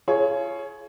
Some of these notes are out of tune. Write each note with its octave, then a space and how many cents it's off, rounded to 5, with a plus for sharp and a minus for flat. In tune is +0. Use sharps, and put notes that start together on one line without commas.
F4 -35 G#4 +30 C#5 +0